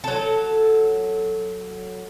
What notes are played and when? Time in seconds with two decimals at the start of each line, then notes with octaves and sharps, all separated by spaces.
0.04 F#3 A4